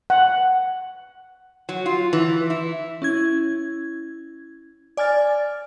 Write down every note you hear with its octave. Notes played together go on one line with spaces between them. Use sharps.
F#5
F#3
F4
E3
E4
C#4 E4 G#6
D5 G#5 F6 A6